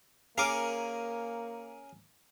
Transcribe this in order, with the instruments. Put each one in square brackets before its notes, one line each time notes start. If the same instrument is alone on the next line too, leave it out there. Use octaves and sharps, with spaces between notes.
[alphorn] A#3 [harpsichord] C#4 G#4 A#4 [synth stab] F5 D6